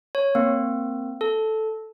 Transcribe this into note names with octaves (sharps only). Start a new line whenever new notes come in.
C#5
A#3 C4
A4